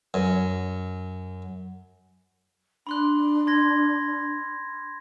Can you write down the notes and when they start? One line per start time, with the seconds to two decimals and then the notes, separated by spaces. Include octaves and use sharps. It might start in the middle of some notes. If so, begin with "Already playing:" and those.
0.14 F#2
2.87 D4 B5 C6 F#6
3.47 C6 G#6 A#6